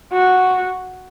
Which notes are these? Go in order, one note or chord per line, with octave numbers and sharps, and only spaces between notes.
F#4